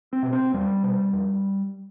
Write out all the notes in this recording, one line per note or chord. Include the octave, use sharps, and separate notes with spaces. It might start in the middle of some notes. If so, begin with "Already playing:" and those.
C4
B2
C4
E2 G3
B2
F2